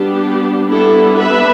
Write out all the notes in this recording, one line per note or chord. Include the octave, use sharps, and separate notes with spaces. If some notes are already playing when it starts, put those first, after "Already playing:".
Already playing: G3 B3 D4 G4
G3 B3 D4 E4 A4
B4 E5